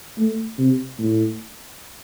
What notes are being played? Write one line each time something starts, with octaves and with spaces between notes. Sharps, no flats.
A3
C3
A2